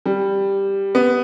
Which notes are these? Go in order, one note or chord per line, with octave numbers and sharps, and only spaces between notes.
G3
B3